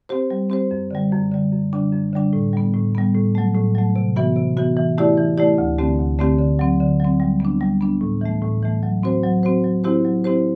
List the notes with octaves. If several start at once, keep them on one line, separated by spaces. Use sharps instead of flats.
C4 G4 C5
G3
C4 G4 C5
F#2
D3 G3
F#2
D3 G3
F#2
D3 G3 D4
F#2
D3 G3 D4
A2
G3 B3
A2
G3 B3
A2
F#3 A3
A2
F#3 A3
C3
E3 B3 F#4
C3
E3 B3 F#4
E3
A3 E4 G4 D5
E3
A3 E4 G4 D5
D2
D3 A3 C4 G4
D2
D3 A3 C4 G4
D3
F#3 C4
D3
F#3 C4
G3
B3 D4
G3
B3 D4
A2
E3 A3
A2
E3 A3
F#3
C4 F#4 C5
F#3
C4 F#4 C5
F#3
C4 E4 G4 C5
F#3
C4 E4 G4 C5